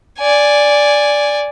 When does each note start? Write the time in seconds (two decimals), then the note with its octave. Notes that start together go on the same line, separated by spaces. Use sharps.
0.20 D5 G#5